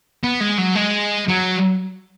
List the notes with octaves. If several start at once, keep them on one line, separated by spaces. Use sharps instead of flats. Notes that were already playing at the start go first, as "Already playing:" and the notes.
B3
G#3
F#3
G#3
F#3